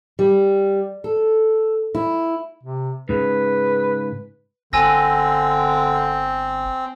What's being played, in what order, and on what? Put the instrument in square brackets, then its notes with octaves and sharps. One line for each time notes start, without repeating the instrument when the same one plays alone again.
[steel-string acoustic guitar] G3
A4
E4
[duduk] C3
[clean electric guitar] G#2 C#3 [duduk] B4
[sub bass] G1 [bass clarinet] D3 [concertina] C4 [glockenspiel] G#5 E6 A#6